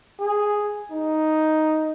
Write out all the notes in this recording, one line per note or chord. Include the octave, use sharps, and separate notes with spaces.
G#4
D#4